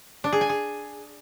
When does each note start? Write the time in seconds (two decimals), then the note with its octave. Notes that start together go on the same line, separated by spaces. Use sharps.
0.24 D4
0.33 G#4
0.41 G#5
0.49 G#4